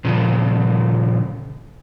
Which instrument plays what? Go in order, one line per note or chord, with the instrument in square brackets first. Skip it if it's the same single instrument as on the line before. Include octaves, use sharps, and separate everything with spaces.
[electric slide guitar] A#2 C#3 F3